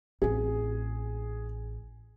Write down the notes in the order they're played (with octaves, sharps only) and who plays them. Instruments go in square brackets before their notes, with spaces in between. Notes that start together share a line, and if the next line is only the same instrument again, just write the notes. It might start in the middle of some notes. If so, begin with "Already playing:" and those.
[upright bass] A1 C4 [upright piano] G#4